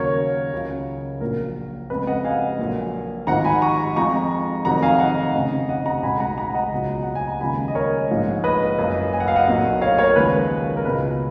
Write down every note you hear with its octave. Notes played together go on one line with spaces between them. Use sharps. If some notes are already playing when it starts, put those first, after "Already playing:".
Already playing: D#2 C#3 F#3 A#4 C#5
C#2 C#3 F#3
A#1 A#2 F#3 A#4
F2 C#3 G#3 B4
D#5 F#5
F5 G#5
A#1 A#2 F#3
G#1 G#2 F3 F#5 A#5
G#5 B5
A#5 C#6
F2 F3 G#3 A#5 C#6
F1 F2 D#3 F#3 F#5 A#5
F5 G#5
D#5 F#5
F1 F2 C#3
D#5 F#5
F#5 A#5
A#5
B1 B2 G#3 G#5 B5
F#5 A#5
F#5 A#5
D#5 F#5
C#2 B2 F#3
F#5
G#5
A#5
D#2 C#3 F3 G#3 G#5 B5
D#5
A#4 C#5
A#1 G#2 F3 G#3
B4 D#5
F#1 F#2 C#3
G#5
F#5
F5
D#5 F#5
B1 A#2 F#3
C#5 F5
A#4 C#5
D#2 C#3 F3 G#3 B4
A#4
C#2 B2 G#3 B4